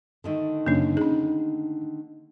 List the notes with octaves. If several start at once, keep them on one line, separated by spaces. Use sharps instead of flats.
D3 D#3 A3
F#2 C#3 A#3 C#4 D4
C#4 D#4 G#4